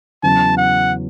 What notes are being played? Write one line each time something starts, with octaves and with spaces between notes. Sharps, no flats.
E2 C#3 F#3 A5
F#5